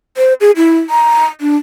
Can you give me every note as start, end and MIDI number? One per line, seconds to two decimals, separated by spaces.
0.17 0.34 72
0.41 0.51 68
0.56 0.79 64
0.90 1.26 82
1.41 1.56 62